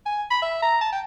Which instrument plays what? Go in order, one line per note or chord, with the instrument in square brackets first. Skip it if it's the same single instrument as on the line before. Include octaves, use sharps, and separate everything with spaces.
[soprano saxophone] G#5
B5
E5
A#5
A5
G5